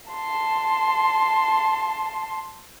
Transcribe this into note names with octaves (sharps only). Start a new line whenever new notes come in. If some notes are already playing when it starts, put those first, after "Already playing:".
A5 C6